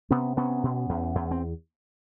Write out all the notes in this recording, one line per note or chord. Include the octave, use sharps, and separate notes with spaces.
C3 B3 C#4
C3 B3 C#4
B2
E2
E2
C4